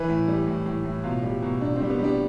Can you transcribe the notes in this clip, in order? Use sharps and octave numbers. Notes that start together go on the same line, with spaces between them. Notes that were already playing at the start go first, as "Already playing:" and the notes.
Already playing: E3 B4
A2
G3
A2
A2
A2
B2 F4
G3
B2
B2 D4
G3 C4
B3
G3 D4